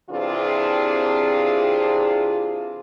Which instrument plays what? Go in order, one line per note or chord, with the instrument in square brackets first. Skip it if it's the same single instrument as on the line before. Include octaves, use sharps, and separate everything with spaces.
[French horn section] C3 E3 C4 D4 F4 G#4